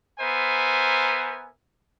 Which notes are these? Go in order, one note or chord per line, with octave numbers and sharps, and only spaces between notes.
B3 A#4 C5 E5 G#5